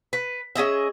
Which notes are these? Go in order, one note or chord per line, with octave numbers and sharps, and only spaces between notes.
B4
C#4 G#4 D#5 E5